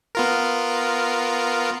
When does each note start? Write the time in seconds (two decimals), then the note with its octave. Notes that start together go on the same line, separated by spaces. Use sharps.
0.15 B3 F4 A#4